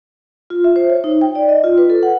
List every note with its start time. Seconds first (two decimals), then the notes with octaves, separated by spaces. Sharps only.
0.50 F4
0.64 E5
0.76 C5
0.90 C#5
1.04 D#4
1.21 G5
1.35 D5
1.49 D#5
1.64 F4
1.78 B4
1.90 A4
2.03 F#5